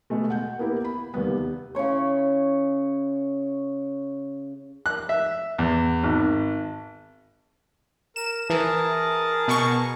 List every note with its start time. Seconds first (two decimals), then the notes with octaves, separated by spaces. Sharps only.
0.10 B2 G#3 A3
0.30 F#5 G6
0.59 A#3 B3 E4 G4 A#4
0.84 B5
1.14 D#2 C3 G3 B3
1.75 C#3 E4 C#5 C#6
4.86 F#6
5.09 E5
5.58 E2
6.03 G#1
8.16 A#4 E7
8.50 E3 G#4 A#4 A5
9.48 B2 C#6